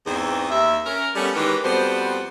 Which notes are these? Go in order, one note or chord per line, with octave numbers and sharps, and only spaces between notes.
E2 G#2 C4 G#4
D#2 E5
C#4 A#4
G3 A3 B3 C#4
D#3 E3 G#3 G4 A#4 B4
F2 G3 B3 F#4 C5